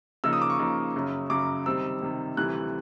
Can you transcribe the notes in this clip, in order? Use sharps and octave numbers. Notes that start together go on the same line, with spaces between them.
C#3 F3 A#3 D#4 E6
D#6
D6
C#6
C#3 F3 A#3 D#4
F#2 C#3 F#3
F#2 C#3 F#3 D6
C3 D#3 G3 C4 E6
C3 D#3 G3 C4
D2 C3 E3 G3 F#6